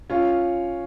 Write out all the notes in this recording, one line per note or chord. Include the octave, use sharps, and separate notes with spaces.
C#4 F4